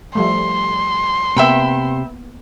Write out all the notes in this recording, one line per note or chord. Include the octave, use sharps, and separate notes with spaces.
F3 G3 A3 C6
C3 A#3 B3 E5 G5 B5